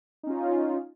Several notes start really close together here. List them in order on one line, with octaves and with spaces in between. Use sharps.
D#4 C#4 F4